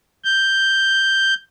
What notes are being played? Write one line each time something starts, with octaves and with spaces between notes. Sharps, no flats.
G6